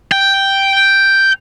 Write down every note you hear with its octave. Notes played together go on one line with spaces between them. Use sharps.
G5